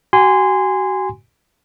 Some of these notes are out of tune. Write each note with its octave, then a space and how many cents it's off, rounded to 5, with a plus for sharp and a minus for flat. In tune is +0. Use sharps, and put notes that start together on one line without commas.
F#4 +35 G#5 -15 C6 -20